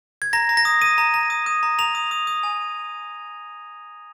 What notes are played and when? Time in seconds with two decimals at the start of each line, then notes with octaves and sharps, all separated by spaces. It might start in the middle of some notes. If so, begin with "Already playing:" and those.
0.22 G#6
0.33 A#5 A#6
0.49 A#5
0.57 A#6
0.65 D#6
0.82 D#6 D#7
0.98 A#5
1.14 A#5
1.30 D#6
1.46 D#6
1.63 A#5
1.79 A#5 F7
1.95 D#6
2.11 D#6
2.27 D#6
2.43 G#5